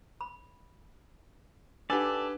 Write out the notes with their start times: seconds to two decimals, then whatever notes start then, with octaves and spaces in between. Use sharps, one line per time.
0.21 B5
1.90 D4 D#4 G4 A4 B4 D5 F#5 G#5